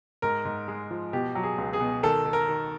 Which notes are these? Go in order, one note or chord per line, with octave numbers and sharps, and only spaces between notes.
G#2 A#4
G#2
G#3
F3
B2 G4
F#3
G#4
C#2
G#4
B2
D#3 A4
D#3
A#4
D#3